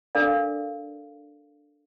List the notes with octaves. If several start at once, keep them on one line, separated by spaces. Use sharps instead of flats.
D4 A4 A#4 D5 F5